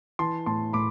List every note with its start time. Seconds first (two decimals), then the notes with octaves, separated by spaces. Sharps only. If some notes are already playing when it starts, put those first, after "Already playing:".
0.19 E3 A5 C6
0.46 A2 A5 C6
0.73 A2 B5 D6